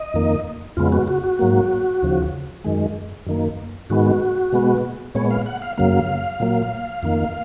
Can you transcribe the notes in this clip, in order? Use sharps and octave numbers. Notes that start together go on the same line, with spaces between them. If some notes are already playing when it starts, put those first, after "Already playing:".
Already playing: D#5
F2 D#3 A#3
F2 C#3 G#3 B3 F4
F#4
F#4
F#4
G#2 F#3 A#3
D#2 C#3 F3
F#2 D#3 G#3
F#2 D#3 A#3
G#2 D#3 G#3 B3 F#4
B2 G#3 B3
A#2 G#3 B3 C#5
F5
F#5
F5
F#2 C#3 F#3 A#3 F5
A#2 F#3 A#3
F2 D#3 A#3